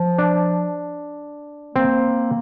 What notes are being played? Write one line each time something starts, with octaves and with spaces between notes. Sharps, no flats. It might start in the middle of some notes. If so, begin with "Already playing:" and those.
Already playing: F3
D4
A#3 C4